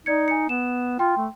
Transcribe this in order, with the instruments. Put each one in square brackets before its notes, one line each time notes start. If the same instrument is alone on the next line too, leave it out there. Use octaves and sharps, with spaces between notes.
[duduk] D#4 [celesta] D5 G#6 C#7
[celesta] G#5 C#7
[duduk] B3 [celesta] E7
[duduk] F4 [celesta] G5 C6
[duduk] A3